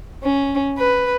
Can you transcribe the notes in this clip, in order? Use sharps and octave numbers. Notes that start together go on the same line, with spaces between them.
C#4
B4